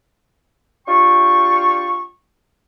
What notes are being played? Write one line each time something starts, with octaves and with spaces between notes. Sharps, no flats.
D4 F4 G4 G5 C#6